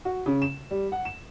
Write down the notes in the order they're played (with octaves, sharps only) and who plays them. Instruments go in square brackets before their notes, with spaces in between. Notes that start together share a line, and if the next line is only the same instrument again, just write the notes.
[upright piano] F#4
C#3
E7
G3
F#5
E7